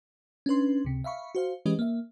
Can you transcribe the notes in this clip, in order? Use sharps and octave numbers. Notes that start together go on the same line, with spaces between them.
C#4 D4 B4 C6
C#2 C3
E5 F5 B5 C#6
F#4 C5 F5
E3 G#3 C#4 G4 B4 D#5
A#3 E5